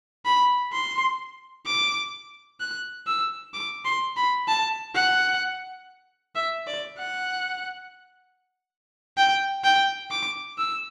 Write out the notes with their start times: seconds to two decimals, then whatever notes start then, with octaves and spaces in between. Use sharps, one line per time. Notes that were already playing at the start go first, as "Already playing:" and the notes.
0.25 B5
0.73 C6
1.66 D6
2.60 F#6
3.07 E6
3.54 D6
3.85 C6
4.17 B5
4.48 A5
4.95 F#5
6.36 E5
6.67 D5
6.98 F#5
9.17 G5
9.64 G5
10.11 D6
10.58 E6